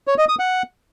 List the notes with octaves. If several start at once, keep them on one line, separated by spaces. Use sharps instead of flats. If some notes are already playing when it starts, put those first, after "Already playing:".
C#5
D#5
D#6
F#5